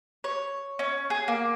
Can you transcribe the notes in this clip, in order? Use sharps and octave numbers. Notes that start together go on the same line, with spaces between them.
C#5
C#4
G#4
A#3